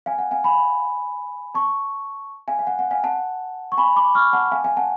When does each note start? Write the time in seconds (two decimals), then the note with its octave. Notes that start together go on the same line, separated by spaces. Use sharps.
0.06 F5 G#5
0.19 F#5
0.31 F5 G#5
0.44 G#5 B5
1.55 A5 C#6
2.48 F5 G#5
2.59 F5
2.67 F#5
2.79 F#5
2.91 F5 G#5
3.04 F#5 A5
3.72 C#6
3.78 G#5 B5
3.96 B5 D6
4.15 C#6 F6
4.33 F#5 A5
4.51 F5 G#5
4.64 F5 G#5
4.77 F#5 A5